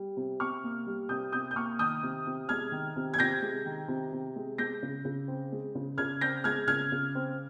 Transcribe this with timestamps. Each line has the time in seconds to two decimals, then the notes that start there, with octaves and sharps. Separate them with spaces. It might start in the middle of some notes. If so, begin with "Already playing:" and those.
Already playing: G3
0.17 C3
0.40 C3 C#6 F6
0.64 A#3
0.87 G3
1.09 C3 D#6 G6
1.32 C3 D#6 G6
1.51 G6
1.56 A#3 C#6 F6
1.79 D#3 D#6 G6
2.03 C3
2.26 C3
2.49 G#3 F6 G#6
2.72 D#3
2.96 C3
3.14 G#6
3.18 C3 G6 A#6
3.42 G#3
3.65 D#3
3.88 C3
4.13 C3
4.36 G#3
4.58 G#3 G6 A#6
4.83 C#3
5.05 C#3
5.28 C4
5.52 G#3
5.75 C#3
5.98 C#3 F6 G#6
6.21 C4 G6 A#6
6.44 G#3 F6 G#6
6.67 C#3 F6 G#6
6.92 C#3
7.15 C4